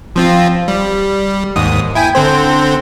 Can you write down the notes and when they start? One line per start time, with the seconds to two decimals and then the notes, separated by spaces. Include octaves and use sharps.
0.16 F3 C4 F4
0.68 G3
1.56 D#2 G#2 D#6
1.95 E4 G5 G#5
2.15 D3 C4 C5